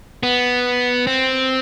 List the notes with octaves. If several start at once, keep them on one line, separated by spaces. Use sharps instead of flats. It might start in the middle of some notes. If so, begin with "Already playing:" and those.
B3
C4